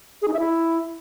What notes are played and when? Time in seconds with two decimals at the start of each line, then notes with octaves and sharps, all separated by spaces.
0.22 G#4
0.28 D#4
0.34 E5
0.39 E4